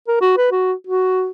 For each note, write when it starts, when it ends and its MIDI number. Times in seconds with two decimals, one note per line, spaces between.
0.08 0.17 70
0.21 0.33 66
0.37 0.50 71
0.52 0.73 66
0.87 1.31 66